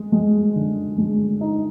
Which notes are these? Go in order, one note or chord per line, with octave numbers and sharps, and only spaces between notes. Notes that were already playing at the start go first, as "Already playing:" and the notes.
Already playing: G#3
G#3
D3
G#3
D#4